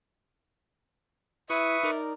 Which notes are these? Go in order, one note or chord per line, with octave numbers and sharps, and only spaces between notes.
E4 B4 E5 C#6 D#6
D#4 A#4 D5